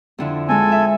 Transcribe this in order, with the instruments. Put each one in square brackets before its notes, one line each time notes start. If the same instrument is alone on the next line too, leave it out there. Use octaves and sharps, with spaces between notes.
[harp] F2 D3 E4
[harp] G#3 C4 [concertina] A4 G#5
[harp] E5